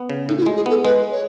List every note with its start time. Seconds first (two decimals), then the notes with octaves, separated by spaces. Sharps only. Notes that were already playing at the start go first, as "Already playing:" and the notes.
Already playing: B3
0.10 C#3
0.28 A2 D#4
0.38 F#4
0.42 E4
0.46 G#3
0.56 G#4
0.66 B3 A4
0.84 G#3 B4
1.12 C#5